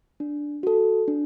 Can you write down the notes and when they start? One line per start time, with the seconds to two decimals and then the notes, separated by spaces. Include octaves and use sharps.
0.20 D4
0.63 F#4 A4
1.08 D4